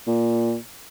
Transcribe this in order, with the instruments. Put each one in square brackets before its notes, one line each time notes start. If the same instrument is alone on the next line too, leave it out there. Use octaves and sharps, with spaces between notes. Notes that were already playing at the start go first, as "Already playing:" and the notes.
[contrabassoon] A#2